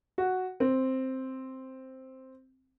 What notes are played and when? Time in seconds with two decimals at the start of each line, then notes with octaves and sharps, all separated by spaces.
0.18 F#4
0.60 C4